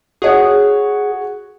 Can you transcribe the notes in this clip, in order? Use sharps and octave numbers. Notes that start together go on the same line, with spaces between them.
F#4 G#4 C#5 F#5